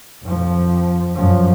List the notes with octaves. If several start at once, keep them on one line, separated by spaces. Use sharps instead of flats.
F2 F3
F#2 F3